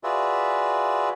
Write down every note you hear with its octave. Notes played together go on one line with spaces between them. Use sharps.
F4 F#4 G#4 B4 D5 E5